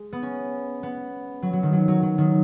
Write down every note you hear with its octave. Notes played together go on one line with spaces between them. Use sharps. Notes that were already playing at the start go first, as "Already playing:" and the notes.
Already playing: G#3
B3
C#4
B3
F#3
F#3
D#3
F#3
F#3
F#3
D#3